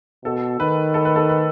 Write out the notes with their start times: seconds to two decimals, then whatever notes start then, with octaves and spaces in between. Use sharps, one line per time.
0.24 B2 A4
0.59 D#3 B4
0.94 A4
1.05 B4
1.16 A4
1.29 B4